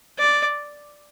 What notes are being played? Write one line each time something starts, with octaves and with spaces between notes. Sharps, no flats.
D5